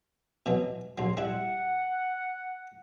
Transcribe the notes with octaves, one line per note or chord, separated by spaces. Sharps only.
B2 E3 F#3
A#1 F#3 C6
G3 E4 F#5